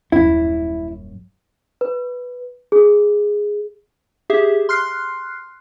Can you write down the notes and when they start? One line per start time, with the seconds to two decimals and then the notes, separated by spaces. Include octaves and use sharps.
0.12 D#1 F#2 E4
1.81 B4
2.72 G#4
4.30 G4 G#4 E5
4.69 C6 F6 F#6 C7